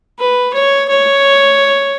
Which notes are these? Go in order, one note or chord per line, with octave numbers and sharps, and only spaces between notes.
B4
C#5
C#5